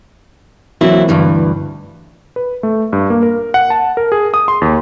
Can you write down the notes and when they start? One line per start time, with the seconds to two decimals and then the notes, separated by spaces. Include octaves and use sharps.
0.81 E3 F#3 A#3 C4 E4 F#4
1.09 D2 G2 E3
2.36 B4
2.63 A3
2.93 G2
3.10 A#3
3.23 A#4
3.54 F#5
3.70 A5
3.97 A#4
4.12 G#4
4.34 D#6
4.48 C6
4.61 D#2